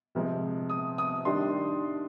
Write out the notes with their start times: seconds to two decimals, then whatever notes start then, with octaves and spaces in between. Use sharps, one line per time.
0.15 C3 F3 G#3
0.70 D#6
0.98 D#6
1.25 D#3 G3 D4 C6